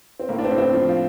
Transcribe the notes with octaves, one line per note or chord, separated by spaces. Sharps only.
C4
A2 A#3
D4
C4
A2
C4
F3
F4